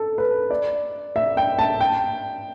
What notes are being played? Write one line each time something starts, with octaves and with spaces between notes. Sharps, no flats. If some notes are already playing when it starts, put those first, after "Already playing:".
Already playing: A4
B4
D5
E5
G5
A5
G5